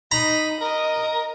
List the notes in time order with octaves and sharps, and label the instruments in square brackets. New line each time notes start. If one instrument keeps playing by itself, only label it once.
[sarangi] D#4 [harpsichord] A#5 [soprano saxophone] B5
[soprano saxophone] A#4 [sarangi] D#5